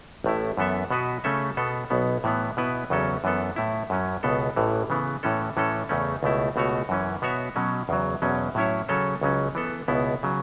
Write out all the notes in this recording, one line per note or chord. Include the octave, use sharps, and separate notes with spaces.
A1 A2 A3 E4
F#2 E3 B3 A4 E5
B2 B3 F#4 B4
C#3 A3 C#4 A4 E5
B2 B3 A4
B1 B2 B3
A2 E3 B3
B2 B3 E4 B4
E2 C#3 F#3 C#4 A4
F#2 E3 B3 A4
A2 A3 E4
F#2 F#3 C#4
C#2 B2 B3 A4
A1 A2 E3
C#3 E3 B3
A2 E3 C#4 A4
A2 E3 C#4 A4
E2 C#3 A3 C#4
C#2 B2 A3 E4
C#2 B2 A3 F#4 C#5
F#2 E3 C#4
B2 B3 F#4 C#5 E5
B2 F#3 C#4
E2 C#3 F#3
E2 B2 F#3 C#4
A2 F#3 C#4 E4 C#5
C#3 F#3 C#4 A4 C#5
C#2 C#3 F#3 C#4
E3 B3 A4
C#2 B2 B3 E4
C#3 F#3